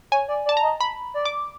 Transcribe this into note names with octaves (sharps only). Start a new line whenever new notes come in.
C#5 G#5
D5
D5
A5
A#5
D#5
B5
D5
D6